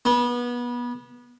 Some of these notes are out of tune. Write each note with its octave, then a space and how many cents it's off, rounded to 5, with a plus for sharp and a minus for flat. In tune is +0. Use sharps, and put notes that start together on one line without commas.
B3 -25